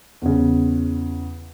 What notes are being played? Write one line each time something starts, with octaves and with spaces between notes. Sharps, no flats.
E2 C#3